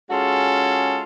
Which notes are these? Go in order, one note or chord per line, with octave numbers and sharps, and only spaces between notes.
G#3 C#4 F4 F#4 G#4 A4